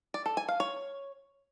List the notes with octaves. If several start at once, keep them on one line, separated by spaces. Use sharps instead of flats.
D5
A4
G#5
F5
C#5